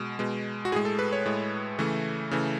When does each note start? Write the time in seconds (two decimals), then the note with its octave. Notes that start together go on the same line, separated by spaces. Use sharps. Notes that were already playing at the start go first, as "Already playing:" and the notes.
Already playing: B2 G#3
0.19 B2 G#3
0.65 F#4
0.72 A2 G#4
0.76 G#3
0.85 A4
0.99 B4
1.13 C#5
1.26 A2 G#3
1.79 C#3 E3 A3
2.31 C#3 E3 A3